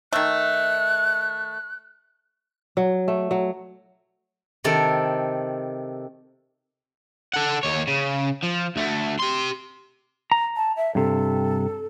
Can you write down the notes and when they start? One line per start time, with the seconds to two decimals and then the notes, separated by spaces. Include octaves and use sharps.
0.13 D#3 A3 F#6
2.77 F#3
3.08 A3
3.31 F#3
4.64 C3 D#3 A4
7.33 A4 F#5
7.63 D#2 C#5
7.88 C#3
8.43 F3
8.76 D2 A3
9.19 G4 C6
10.32 A#5
10.56 A5
10.77 E5
10.95 G2 C3 A4